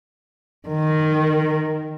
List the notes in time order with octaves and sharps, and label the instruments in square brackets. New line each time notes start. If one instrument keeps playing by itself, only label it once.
[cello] D#3